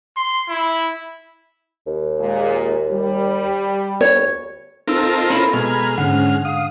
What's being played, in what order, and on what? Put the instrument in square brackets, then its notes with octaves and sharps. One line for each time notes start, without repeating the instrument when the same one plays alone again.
[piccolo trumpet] C6
E4
[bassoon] D#2
[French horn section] A#2 G#3
G3
[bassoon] D2 [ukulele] C#5
[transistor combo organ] C4 F4 A#4 [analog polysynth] D#4 A5 [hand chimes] A4 E6
[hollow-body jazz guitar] C#4 E4 [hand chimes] A4
[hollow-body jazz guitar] B2 [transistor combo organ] G#3 F6 [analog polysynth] A#5 B5 G#6
[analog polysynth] G#2 C#4 [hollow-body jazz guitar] D3 [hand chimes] F#5
[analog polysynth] F5 C7 [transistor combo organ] D#6